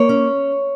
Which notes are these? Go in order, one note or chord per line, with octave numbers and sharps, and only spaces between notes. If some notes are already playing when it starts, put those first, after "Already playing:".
Already playing: A#3 C#5
C#4